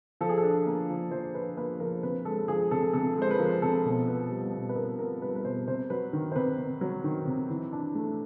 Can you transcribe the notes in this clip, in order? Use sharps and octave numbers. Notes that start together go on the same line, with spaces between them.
F3 A4
G#4
A4
D4
A#3
F3
F3 C5
D4 B4
A#3 B4
F3 A#4
C3 B4
G#3 A4
F3 G#4
C3 A4
C3 A4
G#3 C5
B4
F3 A#4
C3 A4
B2
B3
G3
B2
B4
B2 A#4
B3 A#4
G3 B4
B4
B2 C5
C3 C5
F#3 B4
D#3
C5
C3 B4
C3
F#3
D#3
C3
E3
D4
A3